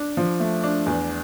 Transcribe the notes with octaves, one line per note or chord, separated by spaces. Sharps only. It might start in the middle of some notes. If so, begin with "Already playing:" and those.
Already playing: D4
F3
A3
D4
E2